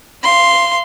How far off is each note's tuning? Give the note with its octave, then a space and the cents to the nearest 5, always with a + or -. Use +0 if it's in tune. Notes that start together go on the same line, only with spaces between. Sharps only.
F5 -25 C6 +0